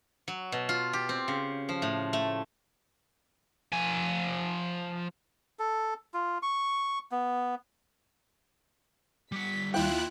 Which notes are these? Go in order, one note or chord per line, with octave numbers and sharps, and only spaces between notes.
F#3
B2
F4
G4
C4
C#3
F3
A2
A3
F3 G#5
A4
F4
C#6
B3
G3 F#5 B6
D#2 E4 F4 G5 F#6